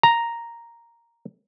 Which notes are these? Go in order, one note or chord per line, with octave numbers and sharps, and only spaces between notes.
A#5